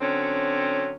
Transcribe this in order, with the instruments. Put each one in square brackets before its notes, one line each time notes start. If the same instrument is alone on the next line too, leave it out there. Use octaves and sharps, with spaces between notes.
[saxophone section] D3 F#3 C4 C#4